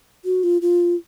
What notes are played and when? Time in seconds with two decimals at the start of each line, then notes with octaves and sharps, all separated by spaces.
0.25 F#4
0.43 F4
0.62 F4